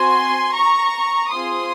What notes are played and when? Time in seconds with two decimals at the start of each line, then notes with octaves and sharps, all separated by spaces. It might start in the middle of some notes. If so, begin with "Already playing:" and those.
Already playing: C4 F#4 G#5 C6
0.52 A#5 C#6
1.31 C4 F4 G#4 C6 D#6